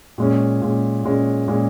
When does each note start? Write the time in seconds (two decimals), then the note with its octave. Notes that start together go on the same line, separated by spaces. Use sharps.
0.18 A#2 G#3 C#4
0.61 A#2 G#3 C#4
1.04 A#2 G#3 C#4
1.48 A#2 G#3 C#4